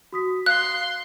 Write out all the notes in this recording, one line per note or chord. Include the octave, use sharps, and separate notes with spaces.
F#4 D#6 B6
F5 C6 F#6